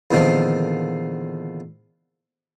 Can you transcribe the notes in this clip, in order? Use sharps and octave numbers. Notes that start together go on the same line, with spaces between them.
E2 A#2 D3 D#3 F3 C4